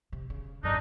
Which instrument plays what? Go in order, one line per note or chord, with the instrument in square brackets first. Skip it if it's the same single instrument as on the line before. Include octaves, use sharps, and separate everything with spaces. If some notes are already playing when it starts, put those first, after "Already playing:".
[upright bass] C3
C#3
[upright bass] G#1 F#2 [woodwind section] D4 D#4